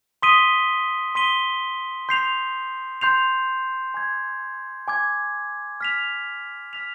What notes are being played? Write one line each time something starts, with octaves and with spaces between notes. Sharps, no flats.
C6 D#6 B6 D#7 G7
C6 D#6 B6 D#7 G7
C6 G6 C7 F7
C6 G6 C7 F7
G#5 D6 G#6
G#5 D6 G#6
F6 B6 F7
F6 B6 F7